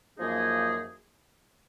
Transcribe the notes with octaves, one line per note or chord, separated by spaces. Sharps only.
F#2 F3 A#3 D#4 G#4